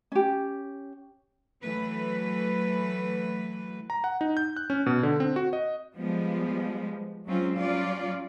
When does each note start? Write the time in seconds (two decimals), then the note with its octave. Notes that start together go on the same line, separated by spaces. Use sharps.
0.12 C#4 G4
1.62 E3 F#3 A3 B4
3.90 A#5
4.04 F#5
4.21 D#4
4.37 G6
4.56 F#6
4.70 C#4
4.86 B2
5.03 D3
5.20 C4
5.36 F#4
5.53 D#5
5.95 F3 G3 G#3 B3
7.26 F#3 G#3 C4 C#4 F4
7.56 F#3 G3 C#4 F4 D5